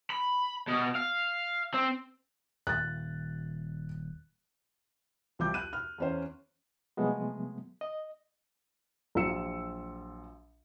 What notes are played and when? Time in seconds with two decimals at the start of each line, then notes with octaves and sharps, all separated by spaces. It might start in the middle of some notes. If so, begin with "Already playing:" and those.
0.10 B5
0.68 B2
0.96 F5
1.74 C4
2.67 D#1 F#6 A6
5.39 C2 F3 G4 D6 G6
5.54 F#6 D#7
5.73 F6
5.98 E2 C#4 C5
6.97 C3 F3 F#3 G#3 A3 B3
7.81 D#5
9.15 A#1 F#3 F4 E6 C#7 E7